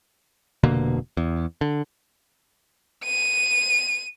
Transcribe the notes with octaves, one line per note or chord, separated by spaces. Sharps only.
F1 B2 D3 A#3
E2
D3
D#7